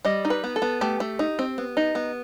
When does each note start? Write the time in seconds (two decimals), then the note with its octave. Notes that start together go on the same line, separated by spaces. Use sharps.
0.05 G3 D#5
0.25 D#4
0.30 B4
0.44 B3
0.56 A4
0.62 B3
0.81 A3 G4
1.00 A3
1.19 D#4
1.39 C4
1.58 B3
1.77 D#4
1.95 B3